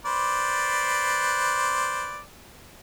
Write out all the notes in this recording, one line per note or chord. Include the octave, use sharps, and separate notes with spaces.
B4 C5 D5